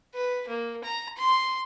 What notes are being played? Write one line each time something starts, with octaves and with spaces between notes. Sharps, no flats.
B4
A#3
A#5
C6